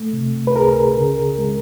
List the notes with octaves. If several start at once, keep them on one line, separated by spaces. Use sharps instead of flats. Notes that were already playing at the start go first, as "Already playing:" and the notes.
Already playing: A3
C3
B4
C#2 G#4 A#4
C#3
G#3